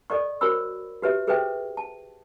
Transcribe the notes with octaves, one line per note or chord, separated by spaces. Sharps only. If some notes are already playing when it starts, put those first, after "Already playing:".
A4 D5 D#5 C#6
F#4 A#4 C5 C#5 B5 E6
F#4 G4 B4 C#5 E5
G#4 A4 B4 C5 E5 G5
A5